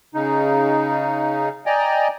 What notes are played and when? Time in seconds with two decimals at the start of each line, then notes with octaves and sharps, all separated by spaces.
0.14 C#3 D#4
1.66 D5 D#5 G5 G#5 A#5